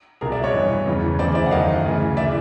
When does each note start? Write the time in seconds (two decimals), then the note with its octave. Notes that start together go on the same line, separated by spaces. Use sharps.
0.21 C2 B2 G#4 A#4
0.32 D5 E5
0.43 C#5 D#5
0.54 G2 E3
0.86 E2 C#3 E3
1.19 D2 C#3 E3 C5 D5
1.35 D5 E5
1.46 F#5
1.51 F#2 D#3 D#5 F5
1.84 D2 C#3 E3
2.17 C#3 E3 D5 E5